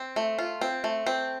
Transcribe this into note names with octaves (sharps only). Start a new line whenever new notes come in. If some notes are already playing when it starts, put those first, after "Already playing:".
Already playing: C4
A3
F4
C4
A3
C4